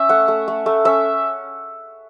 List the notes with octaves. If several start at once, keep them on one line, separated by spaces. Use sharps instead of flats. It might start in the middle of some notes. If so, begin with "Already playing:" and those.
Already playing: C#4 E5
A3 F#5
A3
A3
A3
C#4 E5